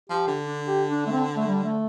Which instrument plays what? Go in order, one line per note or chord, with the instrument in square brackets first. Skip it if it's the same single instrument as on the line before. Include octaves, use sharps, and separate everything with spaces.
[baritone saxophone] F3 [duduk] G4
[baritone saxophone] D3
[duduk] D4
G4
D4
A3
C4
A3
G3
A3